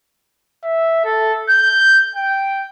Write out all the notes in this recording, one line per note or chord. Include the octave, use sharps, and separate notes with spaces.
E5
A4
G6
G5